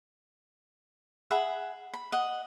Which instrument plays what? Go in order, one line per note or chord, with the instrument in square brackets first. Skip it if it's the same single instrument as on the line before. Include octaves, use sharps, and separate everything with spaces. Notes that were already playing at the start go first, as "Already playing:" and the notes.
[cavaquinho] G#4 E5 F#5 B5
B5
D#5 F#5